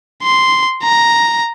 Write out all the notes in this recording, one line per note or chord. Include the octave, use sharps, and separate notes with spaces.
C6
A#5